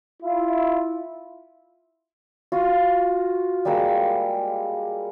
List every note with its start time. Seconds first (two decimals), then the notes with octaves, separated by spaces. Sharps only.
0.23 E4 F4
2.52 F4 F#4
3.65 G3 G#3 A#3 E6